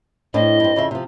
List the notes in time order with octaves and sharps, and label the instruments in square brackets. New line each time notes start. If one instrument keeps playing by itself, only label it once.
[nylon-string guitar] A2 C4 D4 [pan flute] D#5
[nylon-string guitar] G2 C4
F2 C#3 E5
C3 F3